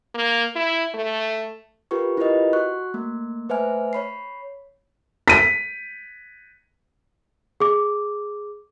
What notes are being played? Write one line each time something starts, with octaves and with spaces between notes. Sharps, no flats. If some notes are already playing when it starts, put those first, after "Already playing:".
A#3
E4
A3
F4 G4 A#4 B4 C#6
E4 F4 G4 A#4 B4 D#5
F#4 C#6 F#6
A3 A#3
A3 B4 C5 E5 G#5 F6
C#5 B5 C7
B6 D#7
G#4 D6